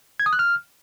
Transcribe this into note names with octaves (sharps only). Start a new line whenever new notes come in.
G#6
D#6
F#6
F6